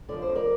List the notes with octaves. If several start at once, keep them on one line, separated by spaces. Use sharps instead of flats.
D3 F3 D5
C5
F2
A#4 D5